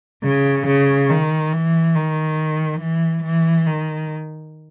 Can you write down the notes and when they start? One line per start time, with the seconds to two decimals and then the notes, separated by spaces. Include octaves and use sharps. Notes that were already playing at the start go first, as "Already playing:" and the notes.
0.23 C#3
0.67 C#3
1.09 D#3
1.53 E3
1.95 D#3
2.80 E3
3.24 E3
3.66 D#3